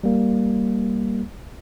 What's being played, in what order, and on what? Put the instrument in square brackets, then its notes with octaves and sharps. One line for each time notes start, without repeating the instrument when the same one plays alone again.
[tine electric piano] G3 A#3